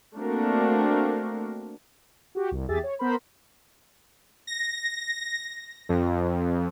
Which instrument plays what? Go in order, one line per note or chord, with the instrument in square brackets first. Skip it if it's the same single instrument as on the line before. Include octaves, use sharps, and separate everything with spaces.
[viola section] A3 A#3 C4 D4 F#4 A#4
[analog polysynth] F#4 G4
C2
E2 G4 G#4 E5 A6
C#5
B3 A#4 C5 B5
[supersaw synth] A#6
F2